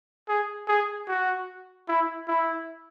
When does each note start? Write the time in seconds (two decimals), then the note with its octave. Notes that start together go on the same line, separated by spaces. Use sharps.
0.29 G#4
0.68 G#4
1.08 F#4
1.88 E4
2.28 E4